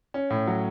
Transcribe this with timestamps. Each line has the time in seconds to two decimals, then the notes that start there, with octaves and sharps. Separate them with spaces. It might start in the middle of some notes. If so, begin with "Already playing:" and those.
0.14 C#4
0.30 A2
0.47 F#3